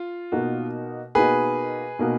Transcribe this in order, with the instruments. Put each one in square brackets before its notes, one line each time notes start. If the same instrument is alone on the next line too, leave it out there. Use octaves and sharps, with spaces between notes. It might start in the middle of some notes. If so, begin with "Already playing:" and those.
Already playing: [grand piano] F4
[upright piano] B2 A#3 D#4 F#4
[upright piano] B2 A#3 D#4 F#4 [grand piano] G#4 B4
[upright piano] B2 A#3 D#4 F#4